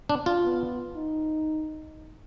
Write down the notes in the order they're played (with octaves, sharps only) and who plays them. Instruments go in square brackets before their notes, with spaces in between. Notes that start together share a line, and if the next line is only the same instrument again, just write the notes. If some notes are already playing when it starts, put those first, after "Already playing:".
[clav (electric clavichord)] D4
F4
[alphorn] B3
D#4